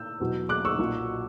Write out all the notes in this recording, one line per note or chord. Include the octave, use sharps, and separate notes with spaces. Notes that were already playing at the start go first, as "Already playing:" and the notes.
Already playing: E6 G6
E2 B2 F#3
D6 F#6
C#6 E6
B1 A#2 F#3